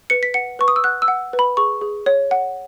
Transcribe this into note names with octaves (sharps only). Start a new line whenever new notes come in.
B4 C#7
B6
F#5 C#7
B4 C#6
D#6
E6
F#5 F#6
E6
F#5
B4
B5
G#4 C#6
G#4
C#5
F#5